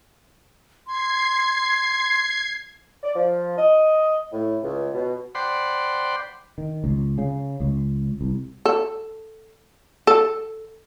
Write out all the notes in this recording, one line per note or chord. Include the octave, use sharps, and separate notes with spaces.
C6 G#6 C7
D5
F3
D#5
A2
C#2
B2
C5 D5 F#5 G5 B5 C6
D#3
C#2
C#3
C#2
C2
A4
A4